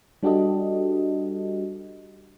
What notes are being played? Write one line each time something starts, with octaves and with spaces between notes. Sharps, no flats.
G3 D4 F#4 G4 A4 D#5